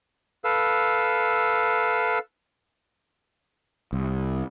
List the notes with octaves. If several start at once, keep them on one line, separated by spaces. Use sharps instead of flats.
A4 B4 F5 E6
C2